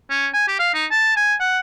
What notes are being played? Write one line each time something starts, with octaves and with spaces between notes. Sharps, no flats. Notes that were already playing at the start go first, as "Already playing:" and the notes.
C#4
G#5
G4
F5
D#4
A5
G#5
F#5